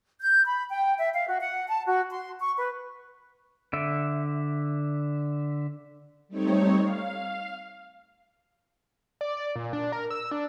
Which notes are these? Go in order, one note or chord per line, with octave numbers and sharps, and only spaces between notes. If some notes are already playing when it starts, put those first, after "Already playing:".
G6
B5
G5
E5
F5
F#4
F#5
A5
F#4
C6
C#6
B4
D3 E5
G3 A3 C4 D#4 C#5
F5
D5
D5
A#2
D4
A#4
E6
D4